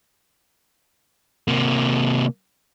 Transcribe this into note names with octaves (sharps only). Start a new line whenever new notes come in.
C3 A#3